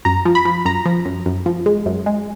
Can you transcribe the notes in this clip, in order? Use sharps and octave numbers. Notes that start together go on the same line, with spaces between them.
F#2 A#5
F3
B5
F3
F#2 A#5
F3
F#2
F#2
F3
G#3
F#2
G#3